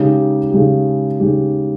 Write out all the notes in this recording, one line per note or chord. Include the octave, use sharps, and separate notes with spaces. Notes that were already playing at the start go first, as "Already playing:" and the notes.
Already playing: C#3 G#3 D#4 G4
C#3 G#3 D#4 G4
C#3 G#3 D#4 G4